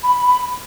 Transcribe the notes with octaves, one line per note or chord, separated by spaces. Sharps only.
B5
B5